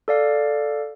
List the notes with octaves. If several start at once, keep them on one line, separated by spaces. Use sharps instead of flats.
A4 D5 F5